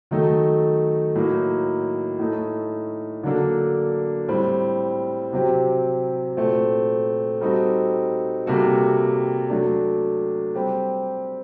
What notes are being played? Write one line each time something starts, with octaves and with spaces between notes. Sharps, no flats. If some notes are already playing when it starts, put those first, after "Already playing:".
D#3 F#3 A3 D#4 A4
A2 F#3 A#3 D#4
A2 A3 D#4 A4
D3 F#3 A#3 D4 A4
A2 G3 C4
C3 F#3 C4 G4
A#2 A3 C4 F#4
G3 C4 D#4 F#4 A4
C3 G3 A#3 F#4 A4
F#3 A3 D4
G3 C4 G4